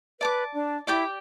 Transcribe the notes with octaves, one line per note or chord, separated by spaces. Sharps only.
B4 D5 A5 D6
D4
E4 G4 D5 G5 D6